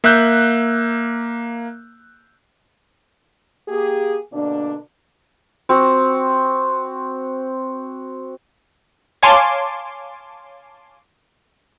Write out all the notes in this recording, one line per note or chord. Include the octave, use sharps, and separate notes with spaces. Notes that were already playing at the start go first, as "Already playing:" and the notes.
A#3 E5 E6 F#6 G6
A#3 G4 G#4
B2 D3 A#3 D4
C4 F#4
C#5 F5 G#5 A5 C6 D6